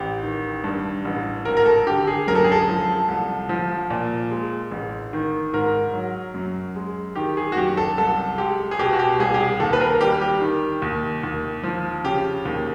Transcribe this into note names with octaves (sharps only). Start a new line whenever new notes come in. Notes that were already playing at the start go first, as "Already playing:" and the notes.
Already playing: A1 G4
D#3
G2
A1
G#1 A#4
A#4
A4
D3 G4
G#4
F#2 A#4
A4
G#4
A4
F3
C2
F3
A#2
G#3
A1
D#3
G#2 A#4
F#3
F#2
G#3
D#3 G4
G#4
F#4
F#2 G4
A4
C2 A4
G#3 G4
G#4
B2 G4
F#4
G4
C2 G#4
G4
G#4
D#2 A4
B4
A#4
G3 G4
G4
D#3
D#2
D#2
F3
C#3 G4
D#2